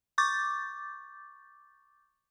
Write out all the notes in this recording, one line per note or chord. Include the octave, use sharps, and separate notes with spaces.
C#6 D6 G6 A6